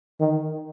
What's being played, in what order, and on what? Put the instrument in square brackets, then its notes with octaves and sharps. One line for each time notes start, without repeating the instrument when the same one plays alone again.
[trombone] D#3